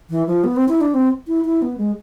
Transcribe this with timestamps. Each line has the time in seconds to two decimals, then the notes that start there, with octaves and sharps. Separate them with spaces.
0.10 E3
0.27 F3
0.44 B3
0.56 C4
0.68 E4
0.81 D4
0.94 C4
1.28 E4
1.45 E4
1.62 B3
1.78 G#3